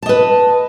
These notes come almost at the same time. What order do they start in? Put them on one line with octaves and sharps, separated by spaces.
A5 D#5 B4